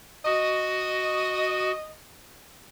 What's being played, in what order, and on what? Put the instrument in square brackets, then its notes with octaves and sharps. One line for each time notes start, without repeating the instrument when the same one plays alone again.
[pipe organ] F#4 [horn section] D#5